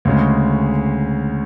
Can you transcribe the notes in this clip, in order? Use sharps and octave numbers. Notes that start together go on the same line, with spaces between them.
D2 C#3 G#3